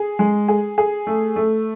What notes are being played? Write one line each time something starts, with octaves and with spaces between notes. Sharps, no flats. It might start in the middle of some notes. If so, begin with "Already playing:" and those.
Already playing: G#4
G#3
G#4
G#4
A3
A3